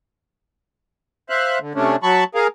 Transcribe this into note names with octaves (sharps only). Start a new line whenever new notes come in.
C5 E5 F5 F#6
D3
C3 A3 C#4 D4
F#3 A5 B5 C#6
G#4 A#4 F5